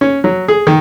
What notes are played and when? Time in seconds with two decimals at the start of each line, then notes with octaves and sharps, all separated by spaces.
0.01 C#4
0.24 F#3
0.48 G#4
0.67 D#3